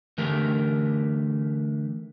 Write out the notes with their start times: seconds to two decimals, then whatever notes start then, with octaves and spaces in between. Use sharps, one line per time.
0.18 D3 E3 A3 G4 A#4